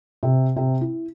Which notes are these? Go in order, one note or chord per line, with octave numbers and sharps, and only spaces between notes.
C3
C3
E4